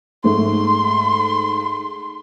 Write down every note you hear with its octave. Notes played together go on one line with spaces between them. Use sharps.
G#2 A3 C6